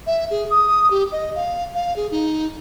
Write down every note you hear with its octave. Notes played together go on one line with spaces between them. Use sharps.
E5
G#4
D#6
G4
D#5
F5
F5
G#4
D#4